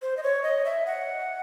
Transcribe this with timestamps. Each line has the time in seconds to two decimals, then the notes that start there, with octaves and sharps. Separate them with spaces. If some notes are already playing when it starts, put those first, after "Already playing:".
0.02 C5
0.17 D#5
0.23 C#5
0.43 D#5
0.65 E5
0.86 F#5